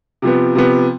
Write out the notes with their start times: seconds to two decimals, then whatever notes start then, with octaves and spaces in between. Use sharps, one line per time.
0.22 C3 F3 B3
0.55 C3 F3 B3